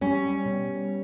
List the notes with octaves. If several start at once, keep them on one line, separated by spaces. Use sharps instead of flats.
G3 C#4
B2